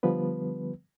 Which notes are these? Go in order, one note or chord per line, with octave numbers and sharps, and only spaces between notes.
D3 F3 G3 B3 B4